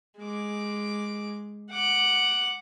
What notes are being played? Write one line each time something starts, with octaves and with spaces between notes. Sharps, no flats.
G#3 D6
F#5 D6